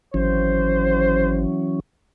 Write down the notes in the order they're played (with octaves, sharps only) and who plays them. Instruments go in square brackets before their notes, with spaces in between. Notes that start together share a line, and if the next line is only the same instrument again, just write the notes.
[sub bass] G#1 [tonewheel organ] E3 F#3 C#4 [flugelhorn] C5